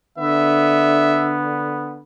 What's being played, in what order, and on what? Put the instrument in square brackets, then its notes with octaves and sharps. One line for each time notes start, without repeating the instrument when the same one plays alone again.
[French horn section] D3 [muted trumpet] B3 [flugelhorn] E5